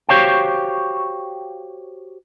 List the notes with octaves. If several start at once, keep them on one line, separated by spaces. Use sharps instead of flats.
F#4 G4 C5 C#5 F5 G5